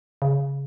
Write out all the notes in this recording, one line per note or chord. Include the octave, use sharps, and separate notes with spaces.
C#3